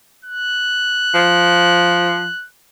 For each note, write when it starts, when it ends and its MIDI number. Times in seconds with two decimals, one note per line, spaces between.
0.25 2.46 90
1.14 2.29 53